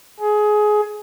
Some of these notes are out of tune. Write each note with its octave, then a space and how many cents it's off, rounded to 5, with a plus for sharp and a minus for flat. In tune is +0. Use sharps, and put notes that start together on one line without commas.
G#4 +20